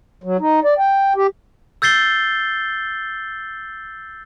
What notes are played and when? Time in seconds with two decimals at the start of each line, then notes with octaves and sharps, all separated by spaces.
0.24 F#3
0.40 D#4
0.64 D5
0.78 G5
1.16 G4
1.82 E6 G6 A6 C7 G7